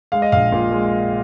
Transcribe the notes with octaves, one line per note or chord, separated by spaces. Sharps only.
G#3 F5
D#5
A#1 F5
A#2
G#3